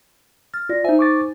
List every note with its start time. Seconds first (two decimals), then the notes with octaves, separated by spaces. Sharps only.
0.54 F6 A6
0.69 F4 D5 A#6
0.84 D#4 C5 E5 G#5
0.99 C#6 D6 A6